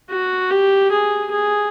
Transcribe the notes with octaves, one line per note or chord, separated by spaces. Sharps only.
F#4
G4
G#4
G#4